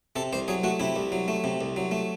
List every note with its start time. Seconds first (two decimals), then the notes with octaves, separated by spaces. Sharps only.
0.16 C3 A4
0.33 C2 C5
0.48 F#3 G#4
0.64 A3 F#4
0.80 C3 E4
0.96 C2
1.12 F#3
1.28 A3
1.44 C3
1.61 C2
1.77 F#3
1.91 A3